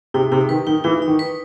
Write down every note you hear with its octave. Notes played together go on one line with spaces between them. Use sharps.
C3 D#4
C3 D#4
D#3 B4
D#3 D#4
E3 D#4
D#4
D#3
B4